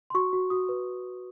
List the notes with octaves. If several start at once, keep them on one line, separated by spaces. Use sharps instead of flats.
C6
F#4 C#6
F#4
F#4 D#6
B4